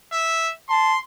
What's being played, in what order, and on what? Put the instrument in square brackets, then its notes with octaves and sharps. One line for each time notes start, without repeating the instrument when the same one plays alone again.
[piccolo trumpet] E5
[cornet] A5 [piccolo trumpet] C6